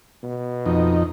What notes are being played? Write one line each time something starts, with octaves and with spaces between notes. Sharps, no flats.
B2
F2 D#4